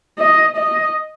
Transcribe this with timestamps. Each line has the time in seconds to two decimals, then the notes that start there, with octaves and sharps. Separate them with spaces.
0.18 D#5
0.57 D#5